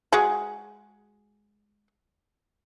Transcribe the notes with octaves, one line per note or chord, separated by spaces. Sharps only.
G#3 F#4 G#4